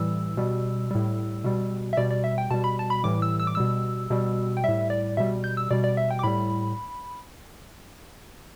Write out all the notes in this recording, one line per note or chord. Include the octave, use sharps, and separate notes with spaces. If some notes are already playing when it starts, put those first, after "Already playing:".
Already playing: A2 E3 G3 E6
B2 G3
A2 G3
B2 G3
E5
B2 G3 D5
D5
E5
G5
B2 G3 A5
B5
A5
B5
A2 E3 G3 D6
E6
E6
D6
B2 G3 E6
B2 G3
G5
A2 G3 E5
D5
B2 G3 E5
G6
E6
B2 G3 D5
D5
E5
G5
D6
A2 G3 B5